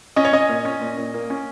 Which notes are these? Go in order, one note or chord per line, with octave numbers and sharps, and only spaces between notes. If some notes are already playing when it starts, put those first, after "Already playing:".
C#4 D#5
C#5
C#4 D#5
A#2
C#4
A#2
A#2
A#3
C#4